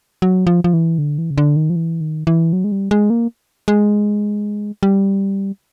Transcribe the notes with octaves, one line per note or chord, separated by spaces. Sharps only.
F#3
F3
F3
E3
D3
E3
C#3
D3
D#3
F3
E3
D#3
E3
F#3
G#3
G3
G#3
A#3
G#3
G3